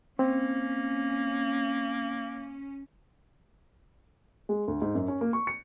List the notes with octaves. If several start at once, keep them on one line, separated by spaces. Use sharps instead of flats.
A#3 C4 C#4
G#3
D2
G#2
F#2
C#4
A#3
C#6
C#7